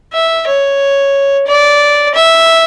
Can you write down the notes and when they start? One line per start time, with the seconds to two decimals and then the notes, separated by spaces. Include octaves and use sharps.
0.14 E5
0.47 C#5
1.48 D5
2.15 E5